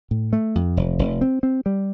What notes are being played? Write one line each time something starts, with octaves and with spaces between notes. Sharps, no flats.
A2
A3
F2
F1
F1
C4
C4
G3